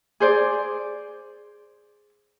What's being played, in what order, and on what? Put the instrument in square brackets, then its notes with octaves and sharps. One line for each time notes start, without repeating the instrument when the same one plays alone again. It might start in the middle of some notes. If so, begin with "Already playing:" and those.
[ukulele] G#4 C5 D5